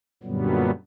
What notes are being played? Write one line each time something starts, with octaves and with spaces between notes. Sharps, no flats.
F#2 A#2 D3 F#3 G3 B3